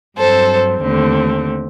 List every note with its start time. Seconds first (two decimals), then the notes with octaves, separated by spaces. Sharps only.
0.18 G2 F#3 C4 A4 C5
0.82 D#2 D3 A3 C4